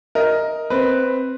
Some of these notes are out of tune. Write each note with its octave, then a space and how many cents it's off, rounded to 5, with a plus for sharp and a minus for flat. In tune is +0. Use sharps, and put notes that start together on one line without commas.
A#4 +0 D#5 +5
C4 +0 B4 +0